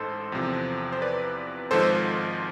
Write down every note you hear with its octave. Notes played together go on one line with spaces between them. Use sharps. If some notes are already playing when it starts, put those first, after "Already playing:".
Already playing: A1 G#2 A4 C5
E2 C3 F3
C5
B4 D5
G#1 G#2 F3 A4 C5